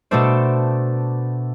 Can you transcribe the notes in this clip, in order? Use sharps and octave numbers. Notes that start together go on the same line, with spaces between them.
B2 A3 D4 A4 C5